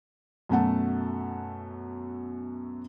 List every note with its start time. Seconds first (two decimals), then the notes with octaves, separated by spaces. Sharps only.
0.49 F#2 B2 A3 F#5 A5